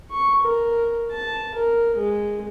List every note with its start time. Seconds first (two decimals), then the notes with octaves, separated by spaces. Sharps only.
0.11 C#6
0.43 A#4
1.12 A5
1.55 A#4
1.96 G#3